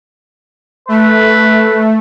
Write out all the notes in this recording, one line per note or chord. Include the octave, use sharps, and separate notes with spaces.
A3 B4